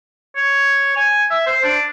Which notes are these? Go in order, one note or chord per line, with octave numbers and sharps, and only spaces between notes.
C#5
G#5
E5
C5
D4